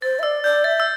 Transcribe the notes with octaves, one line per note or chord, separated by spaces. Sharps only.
C5 A6
E5
D5 E6
D5 G6
E5 A6
E6